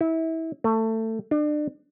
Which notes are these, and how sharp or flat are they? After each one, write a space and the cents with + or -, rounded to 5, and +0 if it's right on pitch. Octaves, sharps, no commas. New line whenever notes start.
E4 -25
A3 +20
D4 +35